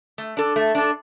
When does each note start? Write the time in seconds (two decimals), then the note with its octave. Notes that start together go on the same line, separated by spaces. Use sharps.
0.18 A3
0.37 D4 A4
0.56 A3
0.75 D4 A4